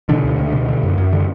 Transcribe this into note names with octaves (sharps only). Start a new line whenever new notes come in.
B2 D3 D4
C#2
C#2
B2
D3
F#2
F#2
D3